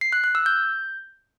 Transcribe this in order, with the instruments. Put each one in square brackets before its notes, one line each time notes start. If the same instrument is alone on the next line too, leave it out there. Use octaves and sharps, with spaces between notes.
[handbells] C7
F#6
F#6
E6
G6